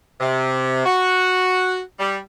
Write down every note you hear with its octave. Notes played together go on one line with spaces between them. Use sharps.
C3
F#4
G3